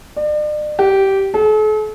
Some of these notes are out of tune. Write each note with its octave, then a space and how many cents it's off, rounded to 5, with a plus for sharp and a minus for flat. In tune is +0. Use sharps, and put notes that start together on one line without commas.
D5 +40
G4 -15
A4 -45